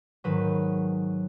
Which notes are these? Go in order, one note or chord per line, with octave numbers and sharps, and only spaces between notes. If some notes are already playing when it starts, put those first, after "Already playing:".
G#2 D#3 F#3 B4